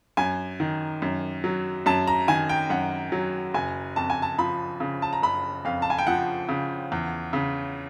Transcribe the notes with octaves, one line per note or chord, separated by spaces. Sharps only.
F#2 G#5
D#3
F#2
F#3
F#2 A5
A#5
D#3 G#5
G5
F#2 F#5
F#3
F#1 G#5
F2 A5
G#5
A5
F3 B5
C#3
A5
A#5
F#1 B5
F2 F5
A5
G#5
G5
F3 F#5
C#3
E2
C#3